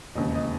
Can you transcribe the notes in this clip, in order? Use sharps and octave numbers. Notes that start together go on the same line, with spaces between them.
E1 D#2 C#3 D#5
D#5